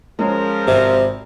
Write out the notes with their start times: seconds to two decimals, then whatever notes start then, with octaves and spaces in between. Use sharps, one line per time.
0.19 F3 G#3 C#4 G#4 A#4
0.67 G#1 C3